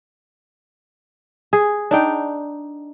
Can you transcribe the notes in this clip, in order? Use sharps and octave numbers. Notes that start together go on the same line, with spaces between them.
G#4
D4 D#4 G5